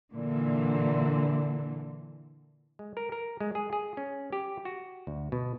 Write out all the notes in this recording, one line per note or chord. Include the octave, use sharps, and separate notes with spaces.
A#2 D3 E3
G#3
A#4
A#4
G#3
G#4
G#4
C#4
G4
F#4
D2
B2